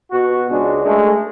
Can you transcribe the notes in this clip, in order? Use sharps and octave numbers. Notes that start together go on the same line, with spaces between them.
B2 F#4
C#2 G#3 D4
G#3 A3